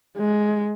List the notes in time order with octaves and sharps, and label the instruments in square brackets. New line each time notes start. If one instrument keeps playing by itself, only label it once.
[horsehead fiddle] G#3